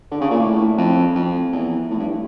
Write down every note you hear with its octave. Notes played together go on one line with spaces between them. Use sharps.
D3
C#3
A#2
A2
F2
F2
E2
A2
G2